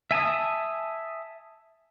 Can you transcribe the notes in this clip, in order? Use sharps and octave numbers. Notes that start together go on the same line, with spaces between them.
E5 G#5 A5 D#6